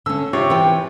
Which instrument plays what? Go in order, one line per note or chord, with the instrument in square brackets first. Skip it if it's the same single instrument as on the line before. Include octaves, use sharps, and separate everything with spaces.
[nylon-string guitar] D3 C#4 [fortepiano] E6
[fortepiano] C3 C#5 [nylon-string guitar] F4
[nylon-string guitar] E3 B4 G5